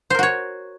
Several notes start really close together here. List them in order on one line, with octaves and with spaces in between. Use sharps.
C5 A#4 F#4 C#5